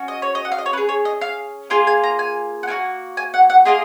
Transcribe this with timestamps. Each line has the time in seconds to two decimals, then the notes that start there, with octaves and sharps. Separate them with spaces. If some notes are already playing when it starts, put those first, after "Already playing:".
Already playing: C#4 F#4
0.08 D#5
0.22 C#5
0.35 D#5
0.45 F#5
0.52 F5
0.58 D#5
0.66 C#5
0.73 C#4 B4
0.77 G#4
0.89 C#5
1.05 D#5
1.21 F5
1.70 A#3 F4 G#4 G#5
1.87 G#5
2.04 A#5
2.19 G#5
2.63 F#5
2.68 A#3 D#4 F#4 G#5
3.17 G#5
3.34 F#5
3.50 F#5
3.65 A#3 F4 G#4 D#5